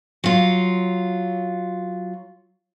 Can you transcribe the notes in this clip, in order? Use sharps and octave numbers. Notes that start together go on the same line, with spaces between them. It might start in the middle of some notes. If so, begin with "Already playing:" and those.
F#3 F4